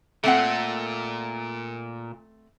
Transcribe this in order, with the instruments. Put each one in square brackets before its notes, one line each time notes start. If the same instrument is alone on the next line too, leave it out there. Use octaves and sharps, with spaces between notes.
[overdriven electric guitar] A#2 [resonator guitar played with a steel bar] A3 C4 F#5